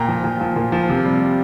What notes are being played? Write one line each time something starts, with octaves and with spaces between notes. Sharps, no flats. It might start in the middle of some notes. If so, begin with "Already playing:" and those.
Already playing: A#2 G5 A#5
F3
A#2
F3
A#2
F3
C3
G3